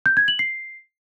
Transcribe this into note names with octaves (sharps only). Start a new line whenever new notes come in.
G6
G#6
F#7
C7